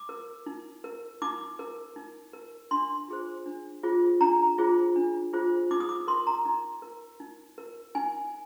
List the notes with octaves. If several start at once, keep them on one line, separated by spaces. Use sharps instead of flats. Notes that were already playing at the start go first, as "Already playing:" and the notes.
Already playing: D6
A#4
D#4
A#4
D#4 D6
A#4
D#4
A#4
D4 C6
F4 G#4 C5
D4
F4 G#4 C5
D4 A#5
F4 G#4 C5
D4
F4 G#4 C5
D#4 D6
D#6
D6
A#4 C6
A#5
D#4
A#4
D#4
A#4
D#4 G#5